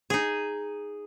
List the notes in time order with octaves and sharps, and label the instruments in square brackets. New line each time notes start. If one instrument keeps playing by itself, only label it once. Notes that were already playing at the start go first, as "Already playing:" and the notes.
[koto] D#4 G#4